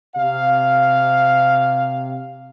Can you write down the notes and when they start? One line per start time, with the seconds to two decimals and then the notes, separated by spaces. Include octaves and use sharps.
0.16 C3 F5